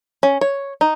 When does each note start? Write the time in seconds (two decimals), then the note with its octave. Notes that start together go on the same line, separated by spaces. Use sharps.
0.23 C#4
0.41 C#5
0.81 D#4